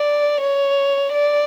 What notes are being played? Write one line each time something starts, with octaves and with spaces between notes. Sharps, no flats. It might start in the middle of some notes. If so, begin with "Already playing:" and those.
Already playing: D5
C#5
D5